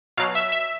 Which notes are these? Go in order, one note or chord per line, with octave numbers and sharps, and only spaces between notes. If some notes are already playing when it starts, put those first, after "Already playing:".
B2 F#3 F5
E5
E5